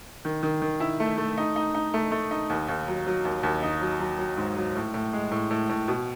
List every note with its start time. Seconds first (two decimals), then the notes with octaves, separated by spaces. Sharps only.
0.25 D#3
0.43 D#3
0.62 D#3
0.80 E4
1.00 A3
1.18 A3
1.38 D#4
1.56 D#4
1.74 D#4
1.94 A3
2.12 A3
2.31 D#4
2.50 D#2
2.68 D#2
2.88 F#3
3.06 F#3
3.25 D#2
3.43 D#2
3.63 D#4
3.81 F#3
4.00 F#3
4.19 F#3
4.37 G#2
4.56 F#3
4.75 A2
4.94 A2
5.13 G#3
5.31 A2
5.51 A2
5.69 A2
5.88 B2